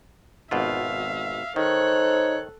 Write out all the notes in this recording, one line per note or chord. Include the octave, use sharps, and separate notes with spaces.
G#1 B2 F4 E5 F5
D#3 D#4 A4 C5 C#5 F#6